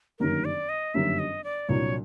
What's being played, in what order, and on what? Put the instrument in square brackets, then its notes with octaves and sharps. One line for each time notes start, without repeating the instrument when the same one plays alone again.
[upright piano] G1 F#2 D#3 G3 A#3 [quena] A#4
[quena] D5
D#5
[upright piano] G1 F#2 D#3 G3 A#3 [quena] E5
[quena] D#5
D5
[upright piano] C2 A#2 F#3 A#3 D4 [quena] C#5